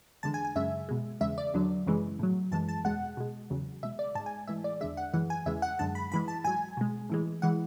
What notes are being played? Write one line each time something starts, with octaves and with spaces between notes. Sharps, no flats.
E2 D3 G#3 A5
G#5
G#5
F#2 C#3 G#3 E5
B2 G#3
E2 C#3 G#3 E5
D5
E2 D3 F#3
F#2 C#3 E3 G#3
A2 F#3
F#2 E3 G#3 A5
A5
E2 B2 G#3 F#5
B2 G#3
E2 C#3 F#3
B2 G#3 E5
D5
G#2 G#3 A5
G#5
A2 E3 G#3 E5
D5
E2 D3 G#3 E5
F#5
F#2 E3 G#3 F#5
G#5
E2 C#3 E3 G#3 E5
F#5
F#2 D3 G#3 A5
B5
G#2 E3 G#3 B5
A5
G#2 F#3 G#5
B2 G#3
A2 E3 G#3
E3 G#3 F#5